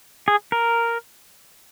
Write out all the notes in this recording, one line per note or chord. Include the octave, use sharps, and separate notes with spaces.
G#4
A#4